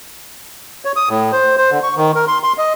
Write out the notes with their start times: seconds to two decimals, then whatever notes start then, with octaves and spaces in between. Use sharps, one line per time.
0.85 C#5
0.96 D#6
1.09 A2
1.32 C5
1.58 C5
1.71 D3
1.83 C#6
1.96 D#3
2.15 A#4
2.28 C6
2.43 C6
2.58 D#5